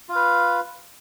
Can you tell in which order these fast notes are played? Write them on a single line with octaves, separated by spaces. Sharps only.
F4 F5 B4